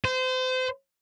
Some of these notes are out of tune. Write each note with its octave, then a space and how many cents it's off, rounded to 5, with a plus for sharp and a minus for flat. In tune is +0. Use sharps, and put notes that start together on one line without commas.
C5 -30